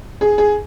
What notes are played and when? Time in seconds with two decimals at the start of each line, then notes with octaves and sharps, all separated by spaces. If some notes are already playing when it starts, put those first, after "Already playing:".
0.21 G#4
0.38 G#4